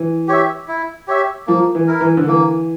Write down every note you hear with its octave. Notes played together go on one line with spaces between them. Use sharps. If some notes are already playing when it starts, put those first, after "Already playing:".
Already playing: E3
G4 C#5 E5
E4
G4 C#5 E5
F3 A#3
E3
E4 A#4
E3
D3
E3 A#3